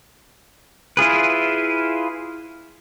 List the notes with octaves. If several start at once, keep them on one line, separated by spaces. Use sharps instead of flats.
E4 F4 G#4 B4